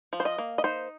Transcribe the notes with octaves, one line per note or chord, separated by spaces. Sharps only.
F3
C5
D#5
A#3
D#5
D#4 C5